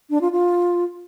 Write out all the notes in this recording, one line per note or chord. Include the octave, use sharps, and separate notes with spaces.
D4
F4
F4